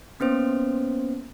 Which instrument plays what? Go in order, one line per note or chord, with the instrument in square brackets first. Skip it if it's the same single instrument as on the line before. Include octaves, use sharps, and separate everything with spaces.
[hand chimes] A#3 B3 C#4 C5